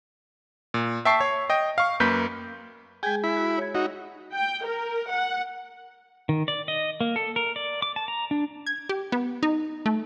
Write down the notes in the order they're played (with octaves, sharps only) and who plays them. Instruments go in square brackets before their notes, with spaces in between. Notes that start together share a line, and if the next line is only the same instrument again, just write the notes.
[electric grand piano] A#2
E5 G5 A5 C#6 C7
C#5
D#5 G5
F5 C#6
F#2 A#3 B4 G6 B6
[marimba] G#3 G#4 [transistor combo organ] G5 G#5
[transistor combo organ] E4 B5
[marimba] F#4
C#5 G#6
[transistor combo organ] D#4 F#4
[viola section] G5
A#4
F#5
[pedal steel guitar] D#3
D5
D#5
A#3
A4
A#4
D5
D6
A5
A#5
D4
[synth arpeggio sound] G#6
G4
B3
D#4
A3